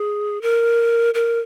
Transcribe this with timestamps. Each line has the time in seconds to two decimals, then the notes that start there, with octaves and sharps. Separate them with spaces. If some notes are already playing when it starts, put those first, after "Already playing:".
Already playing: G#4
0.42 A#4
1.14 A#4